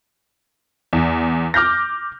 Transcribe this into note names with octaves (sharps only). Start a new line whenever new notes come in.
E2
D6 F6 G6 A#6